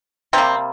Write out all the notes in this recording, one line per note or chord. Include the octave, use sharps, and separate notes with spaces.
C3 G3 A#3 C4